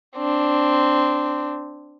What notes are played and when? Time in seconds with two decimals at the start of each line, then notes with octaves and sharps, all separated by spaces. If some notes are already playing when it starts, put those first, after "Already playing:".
0.17 C4 D4